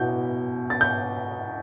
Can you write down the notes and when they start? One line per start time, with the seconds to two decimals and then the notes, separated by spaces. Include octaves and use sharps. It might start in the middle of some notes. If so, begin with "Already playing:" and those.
Already playing: B2 B3 E4 G6
0.70 A6
0.81 G6